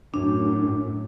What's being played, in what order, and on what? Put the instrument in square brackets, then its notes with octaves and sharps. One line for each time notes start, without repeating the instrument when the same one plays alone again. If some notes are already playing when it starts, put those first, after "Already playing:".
[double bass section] F#2 A2 [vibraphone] D4